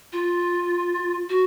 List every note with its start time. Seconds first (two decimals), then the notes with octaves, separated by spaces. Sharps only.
0.13 F4
1.29 F#4